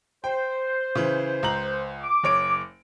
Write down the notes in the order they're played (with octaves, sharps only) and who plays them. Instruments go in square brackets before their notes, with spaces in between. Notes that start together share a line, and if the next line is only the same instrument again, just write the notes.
[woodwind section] C5 [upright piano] G5
[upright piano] C#3 E3
C#2 A#5 F#7
[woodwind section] D6
[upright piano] F#1 C#5 D7